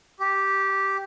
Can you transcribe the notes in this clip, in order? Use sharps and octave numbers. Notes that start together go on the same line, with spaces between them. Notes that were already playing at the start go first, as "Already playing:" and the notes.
G4